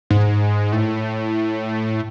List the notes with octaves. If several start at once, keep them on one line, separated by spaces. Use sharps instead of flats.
G#2
A2